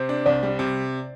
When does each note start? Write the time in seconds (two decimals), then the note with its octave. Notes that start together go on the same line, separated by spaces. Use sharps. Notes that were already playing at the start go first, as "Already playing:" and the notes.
Already playing: C3 C5
0.09 D4
0.26 C2 D5
0.43 G3
0.59 C3